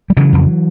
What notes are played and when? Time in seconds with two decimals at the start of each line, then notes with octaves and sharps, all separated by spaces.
0.10 G3
0.17 C#3 E3 F#3
0.33 F2